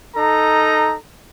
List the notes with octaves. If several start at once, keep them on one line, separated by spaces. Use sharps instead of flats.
D#4 A4 A#5